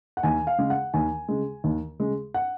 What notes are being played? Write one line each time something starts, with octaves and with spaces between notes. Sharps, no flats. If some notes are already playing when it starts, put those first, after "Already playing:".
F#5
D#2 G#5
F5
C#3 G#3
F#5
D#2 G#5
C#3 G#3
D#2
C#3 G#3
F#5